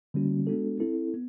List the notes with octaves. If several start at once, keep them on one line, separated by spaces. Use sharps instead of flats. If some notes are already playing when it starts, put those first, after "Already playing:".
D3 G3 A#3 C#4 F#4
G#3 B3 D4 F#4 A4
C4 E4 A4
B3